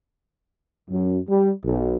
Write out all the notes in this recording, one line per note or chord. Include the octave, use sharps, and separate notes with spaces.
F#2
G3
B1